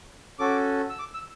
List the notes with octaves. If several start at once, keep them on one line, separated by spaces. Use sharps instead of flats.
C#4 F#4 A4 D6
E6
D6
E6